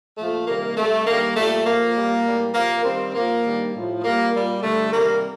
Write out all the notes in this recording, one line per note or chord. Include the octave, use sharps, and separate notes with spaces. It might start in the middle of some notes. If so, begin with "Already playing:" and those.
A#2 F3 A3
C3 D#3 G3 A#3
C3 G3 A3
G2 D#3 G3 A#3
A#2 G3 A3
A#2 F3 A#3
A#2 G3
A2 G3
C3 F3 A#3
G2 D#3 G3 C4
A#2 F3 A#3
G2 D#3 G3
A2 F3
A#2 G3 A#3
A#2 G3
G2 D3 G3 A3
C3 D#3 G3 A#3